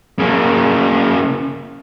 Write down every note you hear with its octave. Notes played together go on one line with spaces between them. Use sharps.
C#3 A#3